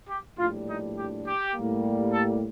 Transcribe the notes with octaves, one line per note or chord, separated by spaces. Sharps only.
G4
A#1 A2 G3 D4 F4
D#4
G4
G4
A2 G3 A#3
A4